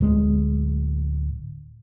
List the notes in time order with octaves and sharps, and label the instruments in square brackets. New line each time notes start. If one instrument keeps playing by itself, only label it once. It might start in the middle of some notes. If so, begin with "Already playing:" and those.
[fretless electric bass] D1 G#3